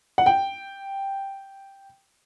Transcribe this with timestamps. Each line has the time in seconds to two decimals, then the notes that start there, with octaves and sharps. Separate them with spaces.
0.18 F#5
0.26 G5